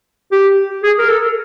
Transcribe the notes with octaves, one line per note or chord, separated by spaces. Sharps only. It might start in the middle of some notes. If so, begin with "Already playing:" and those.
G4
G#4
A#4
A4